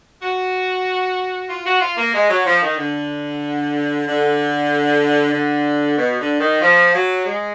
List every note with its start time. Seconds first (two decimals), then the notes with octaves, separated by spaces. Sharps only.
0.21 F#4
1.49 F4
1.64 F#4
1.81 F4
1.97 A#3
2.13 G#3
2.28 F#3
2.44 F3
2.61 D#3
2.77 D3
4.05 D3
5.32 D3
5.96 B2
6.19 D3
6.39 D#3
6.61 F3
6.93 F#3
7.25 G#3